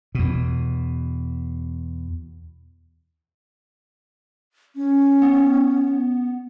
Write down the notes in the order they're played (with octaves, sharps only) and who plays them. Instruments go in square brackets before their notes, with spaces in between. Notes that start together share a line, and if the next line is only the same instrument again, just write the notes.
[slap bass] E2 B2
[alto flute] C#4
[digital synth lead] B3